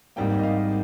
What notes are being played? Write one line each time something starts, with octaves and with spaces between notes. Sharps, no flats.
G#1 G#2 G3 A#3 G5
D#5
F5